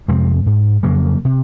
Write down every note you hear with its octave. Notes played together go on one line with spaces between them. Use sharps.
F2 C3 G#3 C4
G#2
F2 C#3 F#3 A#3
C3